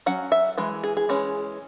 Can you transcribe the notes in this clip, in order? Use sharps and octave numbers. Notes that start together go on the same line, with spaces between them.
F#3 C#4 F#5
E5
E3 G#3
G#4
G#4
E3 G#3 C#4